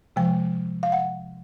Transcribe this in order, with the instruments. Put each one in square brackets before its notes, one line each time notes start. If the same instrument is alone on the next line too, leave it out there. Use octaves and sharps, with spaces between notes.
[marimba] C3 F3 G#3 G5
F5
F#5